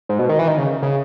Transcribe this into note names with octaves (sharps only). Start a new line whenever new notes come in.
G#2
B2
D#3
E3
D#3
C#3
C#3